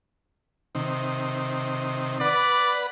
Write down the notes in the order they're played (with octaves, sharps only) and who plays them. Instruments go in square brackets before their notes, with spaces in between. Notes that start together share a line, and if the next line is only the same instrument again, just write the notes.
[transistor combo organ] C3 D#3
[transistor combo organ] B4 F#5 [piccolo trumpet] D5